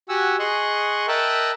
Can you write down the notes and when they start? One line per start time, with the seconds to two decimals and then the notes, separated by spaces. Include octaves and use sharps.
0.09 F#4 G4 F#5 G#5 E6
0.39 G#4 D#5 C6 C#6 F#6
1.08 A#4 D#5 E5 G5 A5 F#6